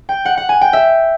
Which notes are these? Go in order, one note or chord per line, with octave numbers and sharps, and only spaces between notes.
G5
F#5
F#5
G#5
G5
E5